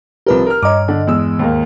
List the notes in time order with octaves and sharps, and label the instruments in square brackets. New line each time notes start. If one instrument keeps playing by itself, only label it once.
[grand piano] C2 F3 A#4 [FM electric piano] G4 B4
[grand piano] A#4 F6
[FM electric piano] G2 D#5 [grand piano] C#5 A#5 D6
[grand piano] D3 D4
E2 G#3 E6
D#2 G#2 A#3